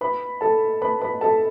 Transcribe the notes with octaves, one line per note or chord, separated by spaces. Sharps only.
B4 B5
A4 A5
B4 B5
B4 B5
A4 A5